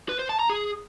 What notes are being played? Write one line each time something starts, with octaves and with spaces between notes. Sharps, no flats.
B4
C5
A5
A#5
G#4